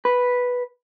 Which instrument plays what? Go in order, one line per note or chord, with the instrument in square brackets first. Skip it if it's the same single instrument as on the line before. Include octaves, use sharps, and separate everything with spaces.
[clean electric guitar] B4